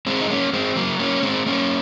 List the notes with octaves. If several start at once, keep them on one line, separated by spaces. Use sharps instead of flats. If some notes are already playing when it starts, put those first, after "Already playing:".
G#3 C4
D#4
A#3 C#4
G#3 C4
F#3 A#3
A#3 C#4
G#3 C4
A#3 C#4